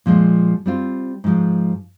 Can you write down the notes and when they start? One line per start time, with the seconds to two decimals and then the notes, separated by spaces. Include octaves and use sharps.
0.06 A#2 F3 G#3
0.66 G3 C4 F4
1.24 G#2 F3 G#3